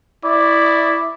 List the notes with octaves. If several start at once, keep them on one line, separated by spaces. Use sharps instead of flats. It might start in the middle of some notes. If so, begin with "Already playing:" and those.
E4 D5